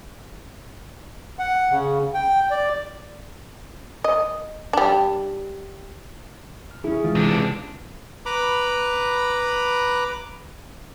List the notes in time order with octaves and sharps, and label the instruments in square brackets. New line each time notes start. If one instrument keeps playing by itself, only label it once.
[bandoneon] F#5
C#3
G5
D5
[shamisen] D#5
G3 D4
[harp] F6
[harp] C#4 E4 [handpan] G#4
[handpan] E3 G#3 [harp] F4
[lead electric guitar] C3 D4
[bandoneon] B4 A#5 B5 D6